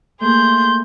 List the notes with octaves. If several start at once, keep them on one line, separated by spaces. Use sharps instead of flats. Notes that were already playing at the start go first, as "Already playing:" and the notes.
A3 A#3 G#4 C6 G6